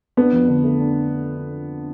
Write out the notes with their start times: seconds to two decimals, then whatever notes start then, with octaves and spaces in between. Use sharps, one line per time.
0.17 B3 D4
0.33 F2
0.48 D3
0.64 A3
0.79 D4